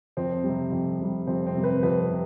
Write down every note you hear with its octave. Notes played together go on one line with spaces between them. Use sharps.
F2 C4
C3 G3
F2
C3 G3
F2 C4
C4
C3 G3
B4
F2 B4
C3